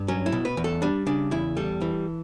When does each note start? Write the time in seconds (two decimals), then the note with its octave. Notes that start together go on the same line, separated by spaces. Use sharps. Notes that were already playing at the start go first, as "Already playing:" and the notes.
Already playing: G2
0.08 F#3 C#4
0.26 E4
0.32 B2
0.45 B4
0.57 E2
0.64 A4
0.82 G3 D4
1.07 C#3 D4
1.31 E2 E4
1.57 G3 A4
1.81 E3